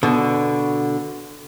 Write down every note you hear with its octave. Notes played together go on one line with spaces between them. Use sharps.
B2 D3